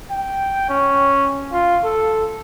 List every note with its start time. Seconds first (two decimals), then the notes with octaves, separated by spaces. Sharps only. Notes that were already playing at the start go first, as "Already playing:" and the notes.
0.11 G5
0.70 C#4
1.53 F4
1.84 A4